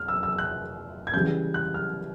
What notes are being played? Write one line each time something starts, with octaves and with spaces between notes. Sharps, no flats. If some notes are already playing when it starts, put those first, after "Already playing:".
Already playing: F6
E6
E6
F#6
G#6
C#3 E3 G3 G6
F#6
F6